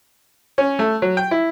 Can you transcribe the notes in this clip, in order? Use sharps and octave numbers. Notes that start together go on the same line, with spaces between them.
C#4
A3
F#3
G5
E4